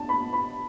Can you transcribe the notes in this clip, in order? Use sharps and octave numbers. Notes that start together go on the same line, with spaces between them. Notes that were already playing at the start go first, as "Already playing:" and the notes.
Already playing: B3 D4 A5
B5
B3
B5